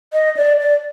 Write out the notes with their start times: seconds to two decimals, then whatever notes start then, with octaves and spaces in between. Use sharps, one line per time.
0.13 D#5
0.37 D5
0.60 D5